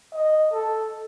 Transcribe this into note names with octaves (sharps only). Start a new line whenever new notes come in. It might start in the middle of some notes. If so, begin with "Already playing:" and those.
D#5
A4